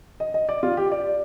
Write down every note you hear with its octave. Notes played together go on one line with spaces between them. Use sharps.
D#5
D#5
D5
F4
G4
D5